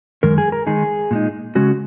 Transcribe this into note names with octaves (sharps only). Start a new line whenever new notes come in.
F#2 D#3 G#3 A#4
G#4
A#4
D#3 G#3 D#4 G#4
A#2 G#3 D#4
C#3 G#3 C#4 F#4